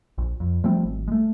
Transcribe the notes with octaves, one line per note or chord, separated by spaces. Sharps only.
A#1
F2
F3 G3 A3 C4
G#1
G#3 A3